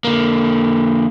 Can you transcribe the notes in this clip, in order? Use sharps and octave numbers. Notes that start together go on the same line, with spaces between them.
D3 A#3